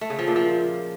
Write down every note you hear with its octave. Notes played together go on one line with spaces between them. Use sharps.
A3
C#3
F3
A#2
F3